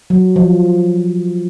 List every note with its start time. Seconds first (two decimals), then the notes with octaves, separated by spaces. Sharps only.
0.10 F#3
0.36 F3